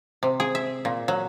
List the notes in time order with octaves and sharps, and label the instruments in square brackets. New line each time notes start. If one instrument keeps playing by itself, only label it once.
[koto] C3
G#4
E5
A#2
F#3